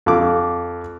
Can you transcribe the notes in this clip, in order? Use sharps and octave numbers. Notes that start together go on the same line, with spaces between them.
F2 D6